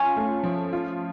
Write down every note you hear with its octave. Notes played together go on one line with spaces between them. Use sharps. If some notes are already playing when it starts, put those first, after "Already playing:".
Already playing: C#4 F4
A3
F3
F4